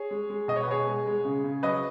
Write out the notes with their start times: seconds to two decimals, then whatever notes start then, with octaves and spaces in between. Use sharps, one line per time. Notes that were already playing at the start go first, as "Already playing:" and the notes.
Already playing: G#4 C#5
0.11 G#3
0.30 G#3
0.48 B2 D#5
0.56 C#5
0.63 B4
0.68 B2 G#4 C#5
0.87 G#3
1.07 G#3
1.25 C#3
1.44 C#3
1.63 F#3 B4 D#5